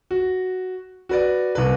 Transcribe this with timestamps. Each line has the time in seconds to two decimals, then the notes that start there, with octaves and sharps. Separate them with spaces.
0.11 F#4
1.09 F#4 B4 D5
1.55 C2 B4